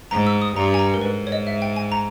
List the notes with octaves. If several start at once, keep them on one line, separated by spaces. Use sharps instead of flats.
G#2 A#5
E6
D#6
G2 A#5
G#5
A#5
A#4
G#2 B4
C#5
D#5
E5
G5
G#5
A#5